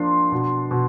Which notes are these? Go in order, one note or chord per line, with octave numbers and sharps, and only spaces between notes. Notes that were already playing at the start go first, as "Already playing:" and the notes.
Already playing: F3 A#3 D4 C6
B2
B2